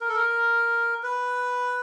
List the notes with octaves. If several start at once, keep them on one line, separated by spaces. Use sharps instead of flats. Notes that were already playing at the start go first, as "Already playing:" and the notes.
A#4
A4
A#4
B4